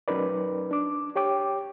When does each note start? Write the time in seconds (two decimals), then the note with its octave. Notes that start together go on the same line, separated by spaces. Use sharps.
0.08 F#3 C#4 D#4 A#4 B4 D5
0.71 D4 D6
1.16 G4 C#5 G5 D6